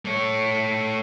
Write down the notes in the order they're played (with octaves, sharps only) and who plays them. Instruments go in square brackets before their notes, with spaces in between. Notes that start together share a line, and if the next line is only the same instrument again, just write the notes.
[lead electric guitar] A3 C#5